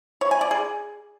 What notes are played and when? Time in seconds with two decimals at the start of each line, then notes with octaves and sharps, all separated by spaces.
0.21 C#5
0.31 G#5
0.41 D5
0.51 G#4